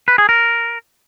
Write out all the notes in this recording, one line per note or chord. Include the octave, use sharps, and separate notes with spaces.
B4
G#4
A#4